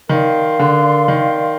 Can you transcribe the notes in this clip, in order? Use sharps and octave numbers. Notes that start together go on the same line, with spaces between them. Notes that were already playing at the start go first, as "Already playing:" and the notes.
D#3 A#4 D5 F5 C6
D3
D#3